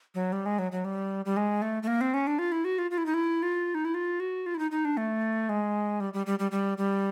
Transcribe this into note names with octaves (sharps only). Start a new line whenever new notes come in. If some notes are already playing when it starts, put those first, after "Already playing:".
F#3
G3
G#3
F#3
F#3
G3
G3
G#3
A3
A3
A#3
C4
C#4
D4
F4
E4
F#4
F4
F4
E4
D#4
E4
F4
D#4
E4
F4
F#4
F4
E4
D#4
D#4
D4
A3
G#3
G3
G3
G3
G3
G3
G3